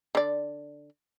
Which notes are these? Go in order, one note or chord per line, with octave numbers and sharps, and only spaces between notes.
D3 D5